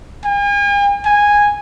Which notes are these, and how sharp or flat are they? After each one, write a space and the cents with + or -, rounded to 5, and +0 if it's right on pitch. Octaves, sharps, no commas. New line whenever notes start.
G#5 -45
G#5 -10